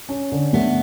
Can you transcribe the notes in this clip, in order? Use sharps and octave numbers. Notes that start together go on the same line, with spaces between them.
C#4
D3
A3 B3